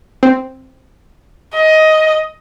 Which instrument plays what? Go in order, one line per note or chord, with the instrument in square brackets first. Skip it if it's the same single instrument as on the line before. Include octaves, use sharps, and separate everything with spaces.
[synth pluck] C4
[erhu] D#5